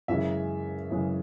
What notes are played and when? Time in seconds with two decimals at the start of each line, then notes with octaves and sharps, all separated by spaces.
0.08 F#2 C#3 E3 G#3 E5
0.91 F#2 C#3 E3 G#3